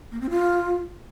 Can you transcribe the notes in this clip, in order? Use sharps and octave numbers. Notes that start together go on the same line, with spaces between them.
A#3
C4
F4